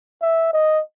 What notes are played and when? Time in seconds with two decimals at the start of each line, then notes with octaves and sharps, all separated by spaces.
0.22 E5
0.53 D#5